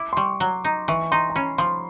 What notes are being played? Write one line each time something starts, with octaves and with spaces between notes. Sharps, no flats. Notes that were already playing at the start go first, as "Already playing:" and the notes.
Already playing: E4 D6
C6
G3 C#6
F#3
D#4
E3 C#6
D#4 C6
A#5
C#4 B5
F3 C6